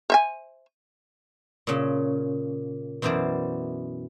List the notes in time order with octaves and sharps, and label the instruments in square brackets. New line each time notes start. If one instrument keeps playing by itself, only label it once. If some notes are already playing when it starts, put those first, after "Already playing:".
[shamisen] C5 E5 G#5
[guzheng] A#2 C#3
F#2 B2 E3 C5 D5